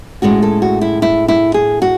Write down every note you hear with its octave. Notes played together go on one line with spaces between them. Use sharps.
A2 G#3 C#4 F#4
A4
F#4
E4
E4
E4
G#4
F#4